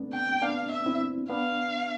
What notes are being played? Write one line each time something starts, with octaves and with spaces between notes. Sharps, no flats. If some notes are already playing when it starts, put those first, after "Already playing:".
Already playing: A3 B3 C4 D4
G5
B3 D4 F5
E5
C4 E4
B3 D4 F5